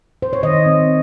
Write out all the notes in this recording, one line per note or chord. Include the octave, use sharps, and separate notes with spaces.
C5
C#5
D#3 D#5
C4